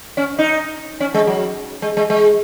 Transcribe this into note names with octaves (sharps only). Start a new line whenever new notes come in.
C#4
D#4
C#4
G#3
F#3
G#3
G#3
G#3